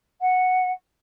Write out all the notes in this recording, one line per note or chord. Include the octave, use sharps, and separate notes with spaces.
F#5